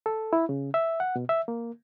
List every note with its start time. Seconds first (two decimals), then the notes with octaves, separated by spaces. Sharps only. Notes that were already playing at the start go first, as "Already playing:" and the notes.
0.06 A4
0.33 E4
0.49 C#3
0.74 E5
1.00 F#5
1.16 B2
1.29 E5
1.48 A#3